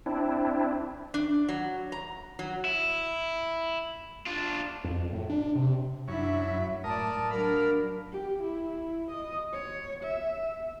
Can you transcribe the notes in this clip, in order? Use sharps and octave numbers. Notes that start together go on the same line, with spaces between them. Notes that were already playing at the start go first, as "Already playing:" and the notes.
C4 D4 E4
D4
F#3
A#5
F#3
E4
D4 F4
F2
A2
D4
C3
F#2 D4 E4 C#5 E5
F#3
A2 A#4 D5 A5 D#6
F#3 D4 A#4 F5 B5
G4
E4
D#5
C#5
E5